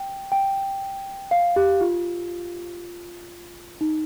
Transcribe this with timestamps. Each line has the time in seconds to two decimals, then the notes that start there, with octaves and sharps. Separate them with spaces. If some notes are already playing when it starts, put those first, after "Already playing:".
Already playing: G5
0.32 G5
1.31 F5
1.56 G4
1.81 F4
3.81 D#4